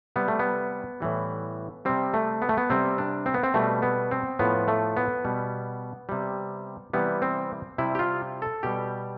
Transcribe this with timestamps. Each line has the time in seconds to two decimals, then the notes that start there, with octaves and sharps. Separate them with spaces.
0.16 C3 G3 B3
0.28 A3
0.39 B3
1.00 A2 E3 G3
1.85 C3 G3 C4
2.14 A3
2.42 B3
2.49 A3
2.57 B3
2.70 C3 G3 C4
2.98 D4
3.26 C4
3.34 B3
3.43 C4
3.54 B2 G3 A3
3.82 B3
4.11 C4
4.39 A2 F3 B3
4.68 A3
4.97 B3
5.25 B2 G3
6.09 C3 G3
6.94 C3 E3 G3 B3
7.22 C4
7.78 C3 G3 E4
7.95 G4
7.99 F4
8.42 A4
8.63 B2 G3 G4